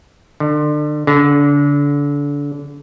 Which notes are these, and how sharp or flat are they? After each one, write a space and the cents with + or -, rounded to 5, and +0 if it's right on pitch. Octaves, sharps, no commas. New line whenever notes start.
D3 +30
D3 -30